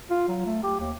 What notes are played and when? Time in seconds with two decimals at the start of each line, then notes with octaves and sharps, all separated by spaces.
0.10 F4
0.28 F#3
0.46 A3
0.64 G4
0.80 D#2